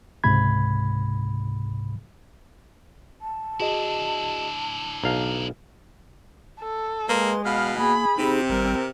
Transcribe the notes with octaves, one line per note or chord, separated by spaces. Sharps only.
C#2 G#2 C3 B5 G#6
A5
D4 E4 F#4 G#4 D#5
B1 F5 A#5
A4
G#3 A#3 B4 C6
B2 F5 B5 F6
A#3 G#4 B5
C3 C4 D#4 G4 G#4
G#1 G3 A#4